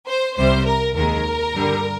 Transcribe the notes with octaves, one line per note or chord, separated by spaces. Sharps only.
C5
C2 C3 G3 C5
A#4
D#2 D#3 G#3 A#4
G2 D3 G3